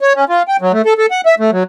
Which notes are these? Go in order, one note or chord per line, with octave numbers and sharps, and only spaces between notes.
C#5
C#4
F4
G5
F#3
A3
A4
A4
F#5
E5
A3
F#3